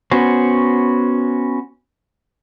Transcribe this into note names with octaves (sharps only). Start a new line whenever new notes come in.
B3 C#4 F#4 C5